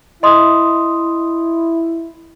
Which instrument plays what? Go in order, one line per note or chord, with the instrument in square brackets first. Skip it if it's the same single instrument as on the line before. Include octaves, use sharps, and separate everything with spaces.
[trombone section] E4 [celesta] D#5 C6 D#6